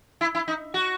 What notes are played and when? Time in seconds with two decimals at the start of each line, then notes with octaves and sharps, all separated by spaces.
0.21 E4
0.35 E4
0.48 D#4
0.74 F#4